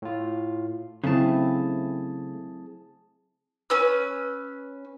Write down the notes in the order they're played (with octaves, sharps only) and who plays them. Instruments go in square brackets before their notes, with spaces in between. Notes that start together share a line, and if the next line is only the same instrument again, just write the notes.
[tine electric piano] A2 F4
[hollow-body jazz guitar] C#3 A3 [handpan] F#3 C4 E4 [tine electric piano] G#4 A5
[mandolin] C#4 B4 E6